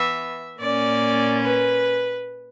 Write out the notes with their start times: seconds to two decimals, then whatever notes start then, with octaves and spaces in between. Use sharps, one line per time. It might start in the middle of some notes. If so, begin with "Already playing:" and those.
Already playing: E3 B3 E5
0.59 A#2 A#3 C#4 D5
1.41 B4